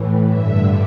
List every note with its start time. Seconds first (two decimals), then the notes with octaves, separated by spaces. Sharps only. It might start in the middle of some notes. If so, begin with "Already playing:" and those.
Already playing: A2 E3
0.27 G2 D3 E5